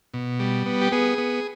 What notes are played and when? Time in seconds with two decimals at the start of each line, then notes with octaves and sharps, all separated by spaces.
0.14 B2
0.40 G3
0.66 B3
0.82 G4
0.92 B3 G#4
1.18 B3